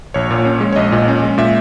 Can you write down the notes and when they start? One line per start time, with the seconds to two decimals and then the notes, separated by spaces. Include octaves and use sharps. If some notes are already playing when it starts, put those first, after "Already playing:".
0.14 A#1 C#5
0.31 A#2
0.45 C#4
0.61 G#3
0.73 C#5
0.76 A#1 D#5
0.92 A#2
1.08 C#4
1.23 G#3
1.38 A#2 E5